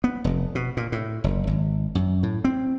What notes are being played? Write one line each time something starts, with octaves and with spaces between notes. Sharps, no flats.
B3
F1
B2
A#2
A2
F#1
G#1
F#2
A2
C4